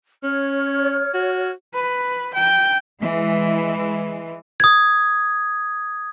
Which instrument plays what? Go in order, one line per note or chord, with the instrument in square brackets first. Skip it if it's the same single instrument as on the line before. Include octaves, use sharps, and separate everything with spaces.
[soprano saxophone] C#4 [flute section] C#5 F6
[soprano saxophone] F#4
[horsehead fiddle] B4
G5
[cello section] E3 G#3
[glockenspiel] D#6 G#6